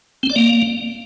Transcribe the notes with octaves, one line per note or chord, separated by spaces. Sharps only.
C4
D5
A#3